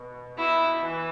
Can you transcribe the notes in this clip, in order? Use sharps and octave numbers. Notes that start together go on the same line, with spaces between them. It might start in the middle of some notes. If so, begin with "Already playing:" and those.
Already playing: B2
B2 E4
E3